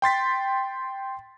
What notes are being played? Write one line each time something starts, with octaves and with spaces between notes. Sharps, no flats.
G5 C6 A6 B6